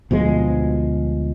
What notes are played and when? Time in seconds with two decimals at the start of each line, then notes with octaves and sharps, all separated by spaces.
0.11 D2 B2 F3 G#3